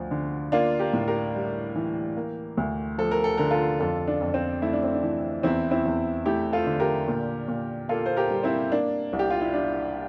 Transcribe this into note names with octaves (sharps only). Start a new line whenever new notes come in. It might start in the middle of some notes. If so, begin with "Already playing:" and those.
Already playing: D2 F3
D3
A#3 D4 F4
G4 A#4
A2
G4 A#4
G3
E3
A#3
D2
F3 A4
A#4
A4
D3 A#4
F4 A4
F2 F4 A4
D4
F2
C4
A3 E4
D4
C4
D4
E3
E2 C4 E4
C4 E4
E2
A3 E4 G4
F4 A4
D3
G4 A#4
A#2
A#2
A#3 F4 A4
C5
G4 A#4
G3
C4 E4
A#3 D4
C2
G4
F4
E4
G3 D4